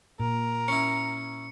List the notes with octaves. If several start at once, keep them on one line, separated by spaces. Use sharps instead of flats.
A#2 A#4
C#4 E4 C#7